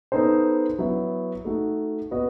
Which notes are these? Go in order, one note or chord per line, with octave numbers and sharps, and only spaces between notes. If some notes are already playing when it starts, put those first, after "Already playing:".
B3 D#4 A4 C5
F#3 B3 E4
A3 D#4 F#4
B3 F#4 B4 D#5